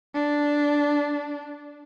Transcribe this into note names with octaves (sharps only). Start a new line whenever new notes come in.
D4